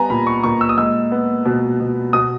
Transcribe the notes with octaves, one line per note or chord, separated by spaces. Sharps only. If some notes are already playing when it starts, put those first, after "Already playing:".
Already playing: G3 B3 G#5 A#5
A#2 B5
C#6
A#2 C#6
E6
D#6
G#3 E6
B3
B2
B2
B2 D#6